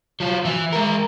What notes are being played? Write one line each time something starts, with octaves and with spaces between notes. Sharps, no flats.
F#3 F4
E3 E4
G#3 A#4